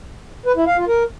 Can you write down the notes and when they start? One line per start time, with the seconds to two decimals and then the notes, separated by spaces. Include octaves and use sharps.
0.46 B4
0.56 E4
0.67 F5
0.77 F4
0.88 A#4